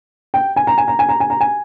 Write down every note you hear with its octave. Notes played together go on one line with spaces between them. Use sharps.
G5
G#5
A#5
G#5
A#5
G#5
A#5
G#5
A#5
G#5